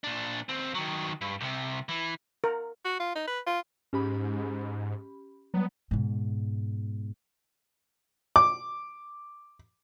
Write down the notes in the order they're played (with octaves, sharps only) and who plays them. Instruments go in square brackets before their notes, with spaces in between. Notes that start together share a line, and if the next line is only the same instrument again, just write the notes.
[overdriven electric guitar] A#2 D4
D#2 C4
D#3 F#3
G2
C2 C3
E3
[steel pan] A#4
[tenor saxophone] F#4
F4
D#4
B4
F4
[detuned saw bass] G#2 [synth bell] C#4 G4 B5
[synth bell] F#3 G3 [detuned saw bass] B3
[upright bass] G#2 B2
[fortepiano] D6